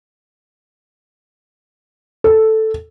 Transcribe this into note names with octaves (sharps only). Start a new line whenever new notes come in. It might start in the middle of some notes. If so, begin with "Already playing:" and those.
A4